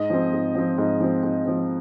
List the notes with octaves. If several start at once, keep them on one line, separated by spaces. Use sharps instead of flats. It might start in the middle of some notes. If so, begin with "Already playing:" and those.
Already playing: G#2 D#5
F3 C4
G#2
F3 C4
G#2
F3 C4
G#2
F3 C4